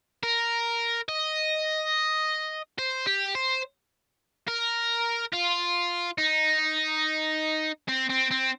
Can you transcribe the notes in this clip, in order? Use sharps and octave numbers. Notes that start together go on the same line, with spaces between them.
A#4
D#5
C5
G4
C5
A#4
F4
D#4
C4
C4
C4